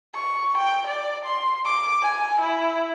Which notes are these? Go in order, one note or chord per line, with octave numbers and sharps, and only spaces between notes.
C#6
G5
D5
C6
D6
G#5
E4